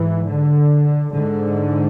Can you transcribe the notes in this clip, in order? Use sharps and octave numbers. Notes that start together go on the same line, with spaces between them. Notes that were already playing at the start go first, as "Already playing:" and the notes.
Already playing: G#2 E3
D3
G#2 D3